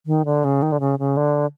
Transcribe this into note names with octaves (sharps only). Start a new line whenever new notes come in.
D#3
D3
C#3
D#3
D3
C#3
C#3
D3